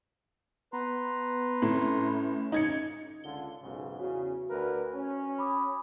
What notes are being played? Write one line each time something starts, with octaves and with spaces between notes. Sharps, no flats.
B3 B4 A#5 C6
A2 C#4
D#4 G#6 C#7
C#2 D3 F4 G7
B1 G#2 C#3
E2 C#3 F#4
D2 A#4 B4
C#4
B5 D6 D#6